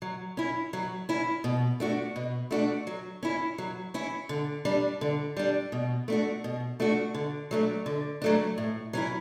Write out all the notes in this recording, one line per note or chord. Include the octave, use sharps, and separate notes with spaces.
F#3
C#4 E4
F#3
C#4 E4
B2
A3 D4 F#4
B2
A3 D4 F#4
F#3
C#4 E4
F#3
C#4 E4
D3
G3 D4
D3
G3 D4
B2
A3 D4 F#4
B2
A3 D4 F#4
D3
F#3 A3 D4
D3
F#3 A3 D4
A2
F#3 C#4 E4